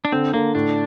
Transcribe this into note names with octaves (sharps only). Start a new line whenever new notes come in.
D4
D3 C4
D3 A#3
A2 D4